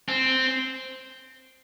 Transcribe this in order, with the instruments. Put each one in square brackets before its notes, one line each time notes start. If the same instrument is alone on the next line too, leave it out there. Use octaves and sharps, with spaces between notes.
[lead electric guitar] C4